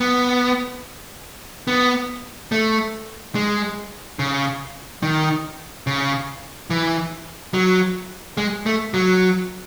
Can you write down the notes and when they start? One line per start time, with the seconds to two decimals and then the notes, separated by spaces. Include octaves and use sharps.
0.01 B3
1.67 B3
2.52 A3
3.35 G#3
4.19 C#3
5.03 D#3
5.87 C#3
6.70 E3
7.54 F#3
8.37 G#3
8.66 A3
8.94 F#3